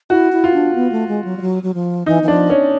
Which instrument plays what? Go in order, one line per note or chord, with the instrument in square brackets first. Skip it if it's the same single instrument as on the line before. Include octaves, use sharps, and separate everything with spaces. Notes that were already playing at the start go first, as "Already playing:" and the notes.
[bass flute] E4 [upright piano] F#4
[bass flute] E4
[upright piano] F4
[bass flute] D4
B3
A3
G#3
F#3
G3
F#3
F#3
F3
[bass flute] E3 [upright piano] D#4
[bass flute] E3
[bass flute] F3 [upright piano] D4
[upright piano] C#4